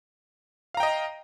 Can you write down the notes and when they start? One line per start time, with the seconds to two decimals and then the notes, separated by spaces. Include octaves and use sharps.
0.74 F5
0.77 A#5
0.80 G5
0.83 D#5